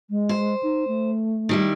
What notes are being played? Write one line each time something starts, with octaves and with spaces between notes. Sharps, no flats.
G#3
C5
D#4
A3
D#3 G3 E4